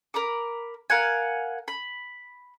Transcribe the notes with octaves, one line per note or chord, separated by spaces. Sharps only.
A#4 A#5 B5 D6
A#4 F5 F#5 G#5
B5